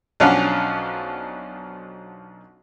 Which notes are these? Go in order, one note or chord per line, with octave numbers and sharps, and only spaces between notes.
B1 F3 C#4 D4 F5 F#5